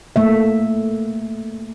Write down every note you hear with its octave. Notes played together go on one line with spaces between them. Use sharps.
A3 A#3 E5